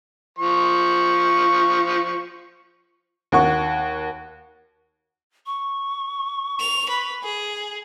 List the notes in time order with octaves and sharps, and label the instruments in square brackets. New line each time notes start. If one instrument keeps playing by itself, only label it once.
[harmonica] F3 C#6
[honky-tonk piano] D#2 F#4 C#6
[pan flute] C#6
[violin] F7
B4
G#4